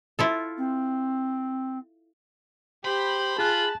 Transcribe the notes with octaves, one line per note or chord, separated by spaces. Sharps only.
E4 F4 A4
C4
G4 C5 B5
F4 G#4 A5 F#6